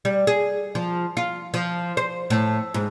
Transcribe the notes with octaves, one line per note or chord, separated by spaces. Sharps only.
G3
G#4
F3
F4
F3
C5
A2
G#2